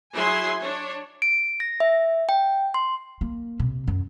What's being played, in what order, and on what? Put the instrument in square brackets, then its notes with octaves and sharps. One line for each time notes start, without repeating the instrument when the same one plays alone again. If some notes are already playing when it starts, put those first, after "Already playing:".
[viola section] F#3 E4 G#4 G#5 C6
D4 C#5
[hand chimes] D7
A#6
E5
G5
C6
[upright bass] A#3
C3
F#2